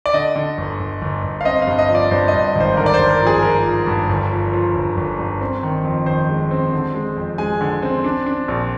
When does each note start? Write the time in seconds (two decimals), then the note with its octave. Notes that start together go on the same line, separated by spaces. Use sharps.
0.06 D5
0.14 D3 D#5
0.35 D3
0.58 G1
0.79 G1
1.02 G1
1.23 G1
1.41 F5
1.45 C4 D#5
1.62 F5
1.67 G2
1.78 D#5
1.89 F3
1.95 D5
2.11 G2 C5
2.28 D#5
2.33 G2
2.44 D#5
2.55 G#1 C5
2.77 D3 A#4
2.86 D5
2.94 C5
2.99 G2
3.10 A#4
3.21 F3
3.26 G#4
3.43 F3 A#4
3.65 F3
3.87 G2
4.09 G1
4.31 F3
4.53 F3
4.75 G1
4.97 G1
5.19 G2
5.41 C4
5.63 D#3
5.84 F2
6.06 D#3 C5
6.29 G#3
6.51 C4
6.73 D3
6.94 G#3
7.16 F2
7.38 G#3 G#5
7.61 D3
7.83 C4
8.04 D4
8.26 D4
8.48 A#1